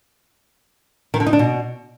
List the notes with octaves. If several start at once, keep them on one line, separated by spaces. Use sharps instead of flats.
D#3
D3
D#4
D4
B2